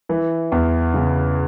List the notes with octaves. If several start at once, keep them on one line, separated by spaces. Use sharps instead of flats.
E3
E2
C#3